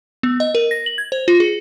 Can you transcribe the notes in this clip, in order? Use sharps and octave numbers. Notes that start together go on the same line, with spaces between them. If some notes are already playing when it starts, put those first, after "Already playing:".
B3
D#5
A#4
A#6
F#7
G#6
C5
F4
G#4